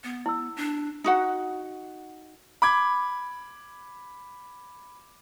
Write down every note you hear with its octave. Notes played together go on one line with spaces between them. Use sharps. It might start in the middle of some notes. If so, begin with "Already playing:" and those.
B3
E4 E6
D4
D#4 F#4 F#5
B5 D6 G#6